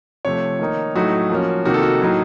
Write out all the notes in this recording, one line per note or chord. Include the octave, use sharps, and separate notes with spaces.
C3 F3 A3 C#5
D#3 A#3 D#4
A2 F#3 A3 D#4 F#4
F3 A#3 C#4
C3 D#3 A#3 D#4 F#4
A4
F#4
A2 F#3 A#3 D#4